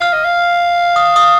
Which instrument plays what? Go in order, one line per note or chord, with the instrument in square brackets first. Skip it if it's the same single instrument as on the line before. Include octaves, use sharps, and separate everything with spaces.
[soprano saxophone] F5 [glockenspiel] F6
[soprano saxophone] D#5
F5
[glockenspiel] D#6
D#6